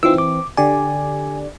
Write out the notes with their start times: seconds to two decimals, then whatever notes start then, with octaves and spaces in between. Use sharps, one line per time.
0.03 E3 C4 D#4 F4 E6
0.18 D6
0.57 D3 G4 D5 G#5